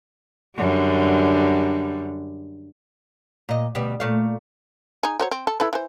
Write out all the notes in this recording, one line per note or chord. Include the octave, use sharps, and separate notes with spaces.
F#2 D3 G3
A#2 D#5
D2 B2 G3
A#2 A3 F5
D#4 G#4
F#3 C5 C#5
C4
A4
E4 A4 B4
E3 C5